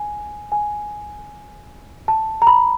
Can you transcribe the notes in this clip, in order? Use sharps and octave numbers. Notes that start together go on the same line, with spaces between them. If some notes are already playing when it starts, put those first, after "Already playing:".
Already playing: G#5
G#5
A5
A#5
B5